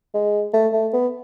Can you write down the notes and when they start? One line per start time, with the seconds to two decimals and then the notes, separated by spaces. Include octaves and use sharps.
0.14 G#3
0.53 A3
0.73 A3
0.93 B3